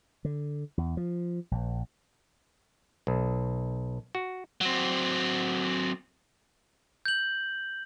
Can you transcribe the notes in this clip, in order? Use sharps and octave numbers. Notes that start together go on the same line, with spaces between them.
D3
E2
F3
A#1
B1
F#4
F#3 C4
G6 F#7